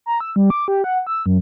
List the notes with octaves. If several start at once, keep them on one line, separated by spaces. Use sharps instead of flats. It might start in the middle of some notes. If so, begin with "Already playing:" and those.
A#5
E6
G3
D6
G4
F#5
E6
F#2